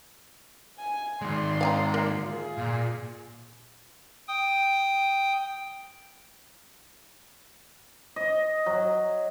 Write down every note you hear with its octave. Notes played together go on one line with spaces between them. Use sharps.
G#5
D#3 G#3 D5 C6
F5 G#5 A#5
A#3
F4 G#4
A#2
G5 D#6
D#5
F#3